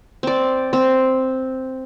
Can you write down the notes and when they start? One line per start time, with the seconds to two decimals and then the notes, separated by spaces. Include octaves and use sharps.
0.23 C4 D5
0.73 C4